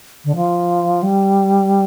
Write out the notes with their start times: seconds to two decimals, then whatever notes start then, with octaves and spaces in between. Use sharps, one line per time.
0.25 D3
0.36 F3
1.02 G3